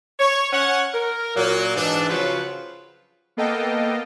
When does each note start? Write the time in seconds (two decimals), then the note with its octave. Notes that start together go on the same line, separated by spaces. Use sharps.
0.20 C#5
0.53 C#4 C#5 F#5
0.94 A#4
1.36 A#2 F#3 A#3
1.76 G#2 E3 D4
2.10 C#3 F3 F#3 F4 B4 C5
3.37 A#3 B3 A4 D#5 F5 G5